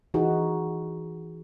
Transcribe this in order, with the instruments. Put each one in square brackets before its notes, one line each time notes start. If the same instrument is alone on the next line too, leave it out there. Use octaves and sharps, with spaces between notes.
[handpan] E3 D#4 F#4 G#4